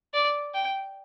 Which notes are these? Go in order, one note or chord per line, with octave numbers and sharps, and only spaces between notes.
D5
G5